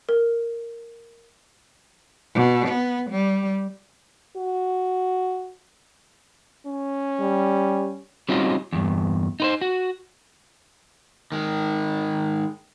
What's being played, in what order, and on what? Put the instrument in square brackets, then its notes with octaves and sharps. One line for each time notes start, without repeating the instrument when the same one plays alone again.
[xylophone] A#4
[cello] B2
B3
G3
[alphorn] F#4
[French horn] C#4
[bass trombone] G3
[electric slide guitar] G3 C4 C#4 D#4 F4 F#4
E2 G2
D#4 B4 C5
F#4
D#3 G#3